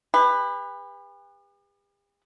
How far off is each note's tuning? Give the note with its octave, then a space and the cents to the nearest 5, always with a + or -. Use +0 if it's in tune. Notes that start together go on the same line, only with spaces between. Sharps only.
G4 +45 B4 +0